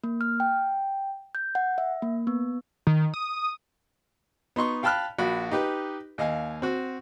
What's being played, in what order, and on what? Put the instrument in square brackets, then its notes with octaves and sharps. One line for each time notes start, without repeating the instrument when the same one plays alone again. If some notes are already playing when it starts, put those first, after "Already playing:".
[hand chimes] A#3
F6
G5
G6
F#5
E5
A#3
B3
[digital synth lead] D#3
D#6
[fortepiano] B3 D#4 C6 C#6
F5 G5 A5 B5 F6 F#6
A#1 F#4 B5
D#4 G4 B4
D#2 D#5 F5 G#5
C4 F#4